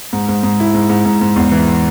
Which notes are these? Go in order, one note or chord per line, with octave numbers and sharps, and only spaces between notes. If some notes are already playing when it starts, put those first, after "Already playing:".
G#2
G#2
G#2
E4
G#2
G#2
G#2
G#2
E2
E3